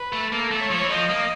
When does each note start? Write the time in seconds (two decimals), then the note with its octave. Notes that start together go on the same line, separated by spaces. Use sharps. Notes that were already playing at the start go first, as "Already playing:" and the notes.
Already playing: B4
0.13 A3
0.32 A#3 A4
0.51 A3
0.61 C#5
0.70 F3
0.81 E3
0.90 F3 D#5
1.09 A#3